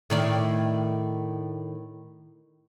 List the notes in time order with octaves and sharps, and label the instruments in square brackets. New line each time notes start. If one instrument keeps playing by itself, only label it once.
[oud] A2 D#3 D5